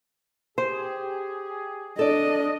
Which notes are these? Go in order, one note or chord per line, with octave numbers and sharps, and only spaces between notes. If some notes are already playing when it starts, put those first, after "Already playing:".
G4 G#4 C5
D4 A4 D5 D#5